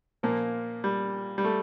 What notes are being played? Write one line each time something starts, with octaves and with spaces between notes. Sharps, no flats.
A#2 F3 A#3
G3
G3
A3